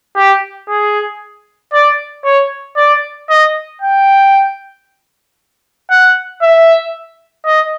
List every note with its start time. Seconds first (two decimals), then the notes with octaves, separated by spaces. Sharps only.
0.16 G4
0.69 G#4
1.73 D5
2.24 C#5
2.77 D5
3.30 D#5
3.82 G5
5.90 F#5
6.42 E5
7.46 D#5